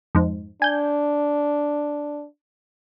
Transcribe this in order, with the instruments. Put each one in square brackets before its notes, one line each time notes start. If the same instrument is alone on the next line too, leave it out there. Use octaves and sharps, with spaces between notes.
[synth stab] F2 G#2
[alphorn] D4 [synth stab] G#5 G6